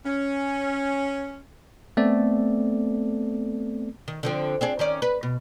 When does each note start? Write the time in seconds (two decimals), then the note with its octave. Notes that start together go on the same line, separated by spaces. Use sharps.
0.06 C#4
1.97 A3 B3 C4 A4 D5
4.08 D#3
4.23 D3 F3 C4
4.61 C4 D4 G#4
4.79 D#3 C#4 D5
5.02 B4
5.23 B2